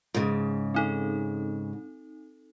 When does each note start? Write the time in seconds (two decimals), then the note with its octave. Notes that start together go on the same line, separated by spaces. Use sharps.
0.14 G#2 C#3
0.74 C4 D#4 A4